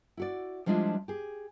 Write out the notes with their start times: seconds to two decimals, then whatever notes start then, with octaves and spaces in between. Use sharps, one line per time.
0.17 E4 F#4 D5
0.66 F3 G3 G#3 D4 E4 F4
1.08 G4 G#4